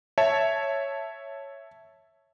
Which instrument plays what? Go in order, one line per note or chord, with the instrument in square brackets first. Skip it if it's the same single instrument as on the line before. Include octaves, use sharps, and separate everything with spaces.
[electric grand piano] C#5 E5 A5